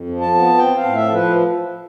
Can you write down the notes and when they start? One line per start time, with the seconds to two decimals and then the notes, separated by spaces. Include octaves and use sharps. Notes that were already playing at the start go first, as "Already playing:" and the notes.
Already playing: F2
0.09 F3
0.21 A5
0.34 B3
0.58 C4 G5
0.77 F5
0.83 A2
0.95 E5
1.06 F3 A4
1.13 B4